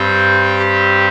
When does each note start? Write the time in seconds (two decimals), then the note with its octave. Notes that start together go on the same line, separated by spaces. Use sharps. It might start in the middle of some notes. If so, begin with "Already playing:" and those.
Already playing: G2 G3 C4 G5
0.58 G4